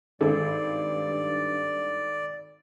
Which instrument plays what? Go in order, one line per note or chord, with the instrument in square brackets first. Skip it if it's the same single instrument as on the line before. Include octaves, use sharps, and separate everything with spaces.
[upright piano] G#1 [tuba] G2 [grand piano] A4 [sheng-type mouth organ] D5